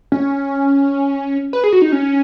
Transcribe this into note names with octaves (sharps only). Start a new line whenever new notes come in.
C#4
B4
G#4
F#4
D#4
C#4